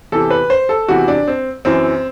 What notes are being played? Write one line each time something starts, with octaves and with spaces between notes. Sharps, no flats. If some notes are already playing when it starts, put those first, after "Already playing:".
E2 C3 E3 A4
B4
C5
A4
E2 C3 E3 F#4
D4
C4
F#2 E3 C4